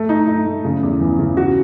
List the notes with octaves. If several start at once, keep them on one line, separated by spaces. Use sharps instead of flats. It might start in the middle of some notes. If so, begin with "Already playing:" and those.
Already playing: A3
D#4
D#4
A3
C#3
E2
E3
C#3
F#4